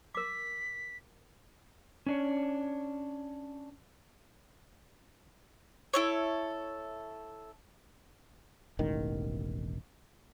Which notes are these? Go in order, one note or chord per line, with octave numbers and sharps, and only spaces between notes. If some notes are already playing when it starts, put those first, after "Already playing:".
A#4 D6 B6
C#4 D4 C#5
E4 A4 C#5
E1 A1 D#3